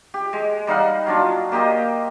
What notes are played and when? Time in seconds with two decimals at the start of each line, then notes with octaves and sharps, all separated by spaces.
0.14 G4
0.33 G#3
0.67 G3 D#4 F5 F#5
1.07 F#3 D4 F4
1.52 A#3 G4 C5 D#5